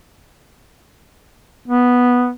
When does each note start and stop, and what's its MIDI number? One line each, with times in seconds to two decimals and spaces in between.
1.68 2.32 59